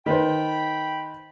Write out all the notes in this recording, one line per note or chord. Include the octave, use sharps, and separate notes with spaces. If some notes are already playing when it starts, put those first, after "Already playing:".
D#3 B4 C5 G5 B5